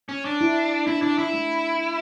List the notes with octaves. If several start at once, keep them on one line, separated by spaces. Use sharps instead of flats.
C#4
D4
E4
D4 E4
D4 E4
E4
A3